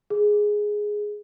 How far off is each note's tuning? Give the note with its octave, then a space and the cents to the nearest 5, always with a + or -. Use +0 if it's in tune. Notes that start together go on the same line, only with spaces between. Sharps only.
G#4 +5